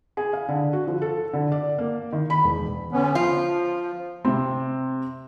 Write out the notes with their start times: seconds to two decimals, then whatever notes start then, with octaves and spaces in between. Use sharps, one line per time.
0.17 G#4
0.33 F5
0.48 D3
0.73 F#4
0.87 F3
1.02 A4
1.33 D3
1.52 D5
1.78 A#3
2.12 D#3
2.30 B5
2.44 E1
2.92 D3 B3 C#4
3.15 F3 F4
4.25 C3 C4